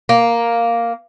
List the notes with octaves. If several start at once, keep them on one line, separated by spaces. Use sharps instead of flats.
A#3